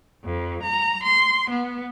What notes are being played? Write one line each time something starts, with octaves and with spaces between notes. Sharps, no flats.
F2
A#5
C6
B3